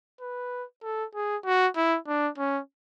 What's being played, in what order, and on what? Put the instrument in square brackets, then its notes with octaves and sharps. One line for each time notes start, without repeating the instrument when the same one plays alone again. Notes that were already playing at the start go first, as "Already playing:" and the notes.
[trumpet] B4
A4
G#4
F#4
E4
D4
C#4